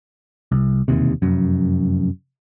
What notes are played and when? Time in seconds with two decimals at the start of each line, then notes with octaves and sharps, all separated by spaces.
0.52 C2
0.88 E1 D#2 C3
1.22 F1 F#2